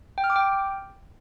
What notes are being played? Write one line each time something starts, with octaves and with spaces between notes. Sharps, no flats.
G5
F6
D6
G5